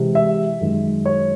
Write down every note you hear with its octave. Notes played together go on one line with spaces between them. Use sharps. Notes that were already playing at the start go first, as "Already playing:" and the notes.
Already playing: C3 E3 G#3
E5
F#2 D#3 G#3
C#5